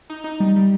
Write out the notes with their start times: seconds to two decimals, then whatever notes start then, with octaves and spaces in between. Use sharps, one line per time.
0.10 D#4
0.24 D#4
0.40 G3
0.56 G3